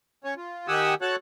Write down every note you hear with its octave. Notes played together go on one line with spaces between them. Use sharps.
C#4 C#5
F4
D#3 G4 F#5 G#5 D#6 E6
F#4 A4 C#5 F#5 A5 F#6